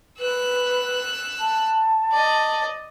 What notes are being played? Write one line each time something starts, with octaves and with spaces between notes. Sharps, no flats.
B4 E6 F#6
A5
D5 D#5